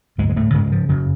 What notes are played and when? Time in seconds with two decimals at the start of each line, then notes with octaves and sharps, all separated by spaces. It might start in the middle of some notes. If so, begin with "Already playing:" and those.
0.18 D2 G#2 G#3
0.29 G#3
0.36 A2 A3
0.53 G#2 C#3 G#3
0.72 F3
0.89 F#2 C#3 F#3